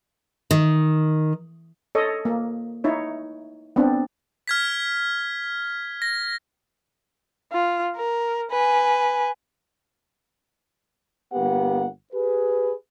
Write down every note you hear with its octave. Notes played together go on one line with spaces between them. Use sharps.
D#3
A4 C#5 D#5
A#3
D#4 E4 C#5
B3 C4 D4
F6 G#6 B6
A#6
F4
A#4
B4 G#5
G1 A#3 B3 G4 F#5
G4 G#4 B4